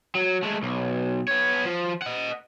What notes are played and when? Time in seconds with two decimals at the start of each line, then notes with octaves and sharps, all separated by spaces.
0.15 F#3
0.43 G#3 A3
0.63 B1
1.28 B3 C#5
1.65 F3
2.02 D#5 F#5